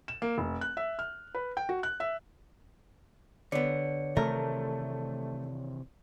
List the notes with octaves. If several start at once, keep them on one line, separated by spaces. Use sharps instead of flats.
E7
A#3
F1
F#6
E5
F6
B4
G5
F#4
F#6
E5
D3 B3 C#5 D5 C#7
C3 D#3 E3 A3 A#4